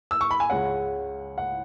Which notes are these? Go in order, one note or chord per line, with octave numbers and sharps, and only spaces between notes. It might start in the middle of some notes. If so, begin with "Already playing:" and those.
E6
C#6
B5
G#5
C#2 C#3 G#3 C#4 F#5
F#5